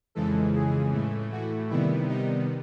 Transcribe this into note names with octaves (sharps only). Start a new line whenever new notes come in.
F2 C#3 E3 G#3 A4
G#4
A2 E3 A3
F#4
C3 D#3 G3 B3 E4
D#4